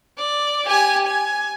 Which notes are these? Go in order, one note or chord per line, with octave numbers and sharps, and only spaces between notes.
D5
G4 G#5
G#5